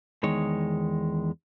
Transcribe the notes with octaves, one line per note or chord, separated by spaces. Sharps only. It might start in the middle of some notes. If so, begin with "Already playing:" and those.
E2 D#3 G#3 C#5